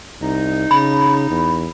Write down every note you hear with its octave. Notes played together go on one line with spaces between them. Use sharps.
C2 D#4
C#3 B5
E2